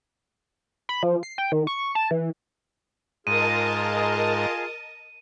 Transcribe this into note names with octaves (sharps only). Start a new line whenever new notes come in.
B5
F3
C7
G5
D#3
C#6
A5
E3
G#2 F4 G#4 A#4 D#5 A5 D#7